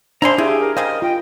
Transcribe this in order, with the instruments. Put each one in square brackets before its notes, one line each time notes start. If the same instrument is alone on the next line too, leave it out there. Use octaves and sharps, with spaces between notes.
[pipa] G#3 A#3 E4 [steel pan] D4 [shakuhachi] C5 [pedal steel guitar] A#5 C6
[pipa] C#3 [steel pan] E4 [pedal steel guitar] G4 G#4 [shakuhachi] E5
[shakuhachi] A#4
[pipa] C#3 G3 C5 [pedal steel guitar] D#5 [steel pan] F5
[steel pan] F4 [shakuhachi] G5